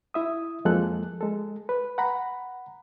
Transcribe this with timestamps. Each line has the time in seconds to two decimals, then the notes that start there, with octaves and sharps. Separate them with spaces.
0.14 E4 E5 D#6
0.65 F2 F3 G#3 A#3 A4 F#6
1.21 G#3 A4
1.69 B4
1.98 F#5 A#5 B5